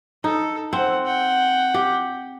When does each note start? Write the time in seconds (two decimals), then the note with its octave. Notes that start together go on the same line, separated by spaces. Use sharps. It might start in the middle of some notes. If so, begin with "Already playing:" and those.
0.24 D#4 A4
0.73 C4 F#5
1.06 F#5 G5
1.74 G4